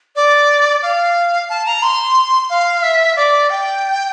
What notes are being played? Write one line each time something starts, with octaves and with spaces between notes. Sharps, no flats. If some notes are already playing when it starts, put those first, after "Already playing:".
D5
F5
A5
A#5
C6
F5
E5
D5
G5